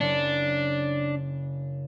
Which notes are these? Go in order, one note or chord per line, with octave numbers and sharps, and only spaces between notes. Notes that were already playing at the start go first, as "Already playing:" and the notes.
F#1 C#3 D4 C#7